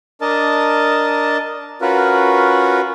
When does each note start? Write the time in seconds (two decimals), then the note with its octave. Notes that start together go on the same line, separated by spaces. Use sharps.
0.21 D4 A#4 D#5 A5
1.81 C#4 F4 F#4 A#4 B4